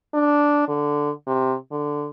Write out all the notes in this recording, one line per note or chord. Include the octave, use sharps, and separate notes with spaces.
D4
D3
C3
D3